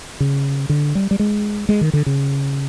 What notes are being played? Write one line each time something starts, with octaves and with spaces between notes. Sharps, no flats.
C#3
D3
G3
G3
G#3
G#3
D#3
D3
C#3